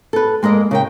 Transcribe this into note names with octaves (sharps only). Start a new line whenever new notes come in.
A4 B4
G#3 A#3 A#4 D#5
C#3 A#4 G5